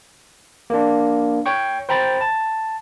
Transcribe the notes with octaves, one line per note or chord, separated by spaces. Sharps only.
A#3 D4
C#5 G5 C#6
C5 G5 A#5 B5 A6
A5